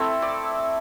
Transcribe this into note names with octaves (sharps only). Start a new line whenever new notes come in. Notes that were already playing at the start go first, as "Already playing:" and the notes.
Already playing: A3 C4 E4 A4 E5
D5